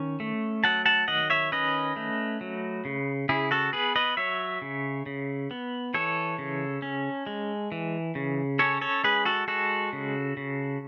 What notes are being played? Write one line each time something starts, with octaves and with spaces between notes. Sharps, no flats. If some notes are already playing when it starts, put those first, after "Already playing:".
Already playing: D#3 C#4
A3
F#3 F#5 A5
F#5 A5
D#3 D#5 F#5
C#5 E5
C#4 B4 D#5
A3
F#3
C#3
C#3 E4 G#4
F#4 A4
B3 G#4 B4
B4 D#5
F#3 C#5 E5
C#3
C#3
B3
E3 A4 C#5
C#3
C#4
G#3
E3
C#3
C#4 A4 C#5
A4 C#5
G#3 G#4 B4
F#4 A4
G#3 F#4 A4
C#3
C#3